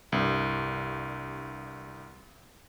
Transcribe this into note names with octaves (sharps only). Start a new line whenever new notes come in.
C2 G2